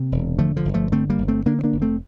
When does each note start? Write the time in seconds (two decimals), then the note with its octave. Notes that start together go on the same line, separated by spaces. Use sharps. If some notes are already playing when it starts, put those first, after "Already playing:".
Already playing: C3 A#3
0.12 E1
0.38 D3 F3 A3
0.56 D3 F3
0.65 G1
0.74 F3 A3
0.92 D3 A3 C4
1.10 G3 A#3
1.18 G1
1.28 A3 C4
1.46 D3 A#3 D4
1.59 C4
1.64 A#3 D4
1.72 F1
1.82 A3 C4